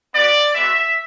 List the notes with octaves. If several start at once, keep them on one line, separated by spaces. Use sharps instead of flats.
B3 F#4 D5
G#3 B3 F#4 E5